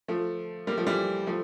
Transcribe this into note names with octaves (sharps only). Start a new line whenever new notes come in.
F3 A3
G3 A#3
F3 A3
E3 G3
F3 A3